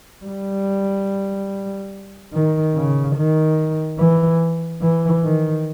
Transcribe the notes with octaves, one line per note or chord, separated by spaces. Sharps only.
G3
D#3
C#3
D#3
E3
E3
D#3